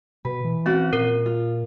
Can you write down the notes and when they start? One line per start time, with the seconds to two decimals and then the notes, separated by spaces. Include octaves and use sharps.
0.25 B2 B4
0.44 E3
0.66 C4 C#4 F#4
0.93 A#2 A#4
1.26 F4